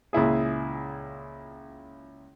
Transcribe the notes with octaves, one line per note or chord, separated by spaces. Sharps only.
C#2 A#2 E4 G#4